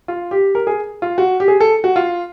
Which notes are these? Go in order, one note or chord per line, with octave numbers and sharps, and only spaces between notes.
F4
G4
A#4
G#4
F4
F#4
G4
G#4
A4
F#4
F4